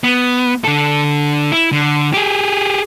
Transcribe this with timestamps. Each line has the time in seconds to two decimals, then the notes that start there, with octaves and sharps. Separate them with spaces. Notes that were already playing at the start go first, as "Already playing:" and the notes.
0.04 B3
0.64 D3 A4
1.52 E4
1.73 D3
2.14 G4 G#4